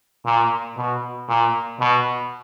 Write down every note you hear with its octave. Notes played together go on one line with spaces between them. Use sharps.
A#2
B2
A#2
B2